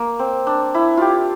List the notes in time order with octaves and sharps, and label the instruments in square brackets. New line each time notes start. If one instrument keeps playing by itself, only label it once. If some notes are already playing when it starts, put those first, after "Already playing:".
Already playing: [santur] A#3
C4
D4
E4
F4 G4